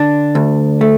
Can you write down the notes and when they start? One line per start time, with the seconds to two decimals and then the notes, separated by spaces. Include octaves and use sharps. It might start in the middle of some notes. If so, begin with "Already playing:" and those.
Already playing: D3 D4
0.35 D2
0.81 A3